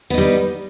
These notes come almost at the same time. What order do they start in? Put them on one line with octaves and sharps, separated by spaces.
B3 D#4 G3